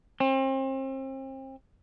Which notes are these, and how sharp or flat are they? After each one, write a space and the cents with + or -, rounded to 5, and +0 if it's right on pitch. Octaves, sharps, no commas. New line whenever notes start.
C4 +35